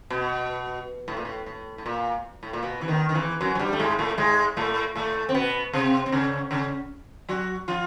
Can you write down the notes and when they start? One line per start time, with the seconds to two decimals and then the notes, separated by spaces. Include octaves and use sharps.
0.10 B2
1.08 A2
1.17 A#2
1.25 A2
1.46 A2
1.78 A2
1.86 A#2
2.43 A2
2.53 A#2
2.63 B2
2.81 E3
2.88 D#2 D#3
3.09 D#3
3.15 E2 E3
3.41 F#2 F#3
3.55 F#3
3.59 G2 G3
3.73 A3
3.79 G#2 G#3
3.98 A2 A3
4.18 G#2 G#3
4.57 A2 A3
4.96 A2 A3
5.29 C4
5.34 B2 B3
5.73 C3 C4
6.06 C4
6.12 C#3 C#4
6.51 C#3 C#4
7.29 F#3 F#4
7.68 F3 F4